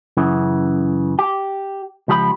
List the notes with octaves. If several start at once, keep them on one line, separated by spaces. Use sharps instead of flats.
F#2 C#3 E3
G4
C#2 F3 G4 D#5 B5